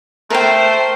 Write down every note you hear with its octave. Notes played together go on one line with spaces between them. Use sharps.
A3 A#4 C5 G5